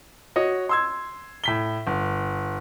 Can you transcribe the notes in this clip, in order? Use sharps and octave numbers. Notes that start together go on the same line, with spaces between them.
F#4 C#5 D#5
C6 E6 G#6
A2 B6 G7
G1